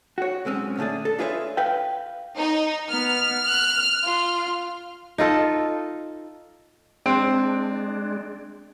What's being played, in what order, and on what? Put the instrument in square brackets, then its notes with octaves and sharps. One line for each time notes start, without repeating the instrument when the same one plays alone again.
[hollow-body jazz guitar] F#4 C#5
B1 G#3 C4 C#4
A#2 D3 A3 G#4 D5
A4
D4 F4 G#4 B4 C#5 E5
B4 F5 G5
[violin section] D#4
[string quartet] B3 [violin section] F6
[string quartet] F#6
F4
[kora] D#4 F4 A4
[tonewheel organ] G#3 D4 [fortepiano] C4